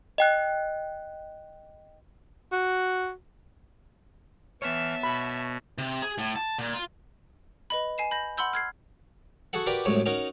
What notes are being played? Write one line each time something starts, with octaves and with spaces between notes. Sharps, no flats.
D#5 G5 F#6
F#4
E3 B3 C#5 E5 A5 F6
B2 B5
C3
G#4
A2
A5
A#2
F4
B4 D#5 B5
G#5 C7 E7
B5 G6 A#6
F#5 B5 C6 E6 G6
F6 G#6 C7
F#4 G#4 A4 F#5
F#4 G4 A#4 B4 D5
C2 F#2 A2 G#3 C#5
C#4 D#4 F#4 A#4